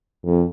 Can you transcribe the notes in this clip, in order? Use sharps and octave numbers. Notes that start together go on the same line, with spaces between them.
F2